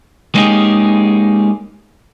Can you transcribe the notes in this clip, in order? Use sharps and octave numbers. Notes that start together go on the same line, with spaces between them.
G#3 A#3 C#4 D#4 G4 G#4